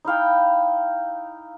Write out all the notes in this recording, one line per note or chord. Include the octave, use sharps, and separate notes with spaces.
D#4 E4 F5 G5